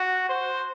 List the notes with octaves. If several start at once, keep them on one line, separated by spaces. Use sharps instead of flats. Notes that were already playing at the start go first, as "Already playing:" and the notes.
Already playing: F#4
C5